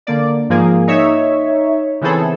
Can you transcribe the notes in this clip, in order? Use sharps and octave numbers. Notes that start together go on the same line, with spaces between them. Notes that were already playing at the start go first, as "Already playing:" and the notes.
D3 A#3 D5
G#2 F3 A#3 G#4
D#4 C#5 E5
C#3 E3 B3 C4 G#4 A4